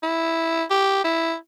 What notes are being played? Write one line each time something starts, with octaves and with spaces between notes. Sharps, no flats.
E4
G4
E4